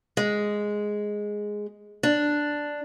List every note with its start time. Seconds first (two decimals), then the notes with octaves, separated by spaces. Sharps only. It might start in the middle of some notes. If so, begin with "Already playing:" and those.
0.17 G#3
2.03 D4